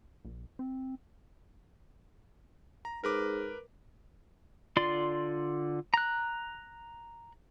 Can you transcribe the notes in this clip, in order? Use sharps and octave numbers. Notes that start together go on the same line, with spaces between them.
A#1
C4
A#5
G#2 A#4 B4 D6
D3 F4 D5 C6
A#5 F#6